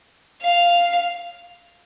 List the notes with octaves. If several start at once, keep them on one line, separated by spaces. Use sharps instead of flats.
F5